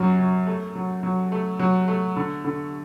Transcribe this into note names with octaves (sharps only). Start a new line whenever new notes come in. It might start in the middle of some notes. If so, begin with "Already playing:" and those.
Already playing: F#2 F#3
F#3
A3
F#3
F#3
A3
F#3
A3
D3
D3